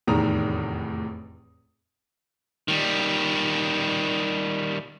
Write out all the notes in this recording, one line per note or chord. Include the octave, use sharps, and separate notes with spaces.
F1 E2 A2 D#3 A#5 D#6
D#3 G3